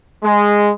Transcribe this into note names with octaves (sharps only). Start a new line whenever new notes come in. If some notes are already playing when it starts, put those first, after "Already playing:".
G#3